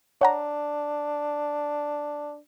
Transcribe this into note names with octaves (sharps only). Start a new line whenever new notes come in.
D4 C#5 F#5 A#5